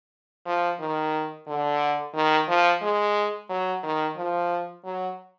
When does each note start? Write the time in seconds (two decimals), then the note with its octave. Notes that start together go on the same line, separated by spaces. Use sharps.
0.46 F3
0.80 D#3
1.47 D3
2.15 D#3
2.48 F3
2.82 G#3
3.49 F#3
3.83 D#3
4.16 F3
4.84 F#3